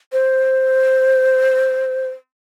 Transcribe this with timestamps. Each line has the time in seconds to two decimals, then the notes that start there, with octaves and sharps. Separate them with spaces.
0.13 C5